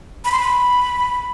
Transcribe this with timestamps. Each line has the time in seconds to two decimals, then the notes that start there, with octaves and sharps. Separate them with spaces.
0.25 B5
0.32 C6
0.39 B5